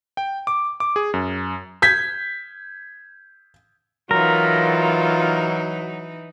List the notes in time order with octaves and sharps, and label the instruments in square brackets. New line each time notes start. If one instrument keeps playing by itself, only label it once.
[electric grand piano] G5
D6
D6
G#4
F#2
[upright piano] G6 G#6 B6
[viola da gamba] E3 D#4 [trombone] F#3 [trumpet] F4 [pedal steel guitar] A#4